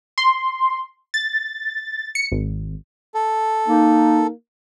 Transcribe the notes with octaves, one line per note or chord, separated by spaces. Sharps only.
C6
A6
C#7
G#1
A4
A#3 D#4